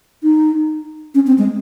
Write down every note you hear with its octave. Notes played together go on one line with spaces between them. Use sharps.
D#4
C#4
C4
G#3